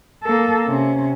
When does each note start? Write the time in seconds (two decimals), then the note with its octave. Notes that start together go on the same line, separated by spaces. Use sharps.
0.24 A#3 A4
0.66 C3 C#4